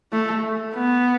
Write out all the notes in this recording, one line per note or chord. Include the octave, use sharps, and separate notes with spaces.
A3
B3